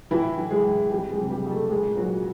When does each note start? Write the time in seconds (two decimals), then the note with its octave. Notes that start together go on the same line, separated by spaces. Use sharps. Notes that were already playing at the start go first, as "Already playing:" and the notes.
0.11 A2 E3 E4
0.38 E3
0.51 G#3 G#4
0.64 A2
0.90 F2 G3 G4
1.10 G#3 G#4
1.18 C3
1.30 G3 G4
1.44 F2
1.51 A3 A4
1.70 A#2 G#3 G#4
1.97 A#2 F#3 F#4